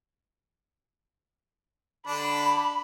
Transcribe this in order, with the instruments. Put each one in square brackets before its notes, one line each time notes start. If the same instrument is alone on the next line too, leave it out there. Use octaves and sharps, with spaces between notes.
[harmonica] D3 D4 [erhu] B5